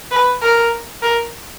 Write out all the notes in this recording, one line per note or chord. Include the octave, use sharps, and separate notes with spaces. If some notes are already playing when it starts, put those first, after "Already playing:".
B4
A#4
A#4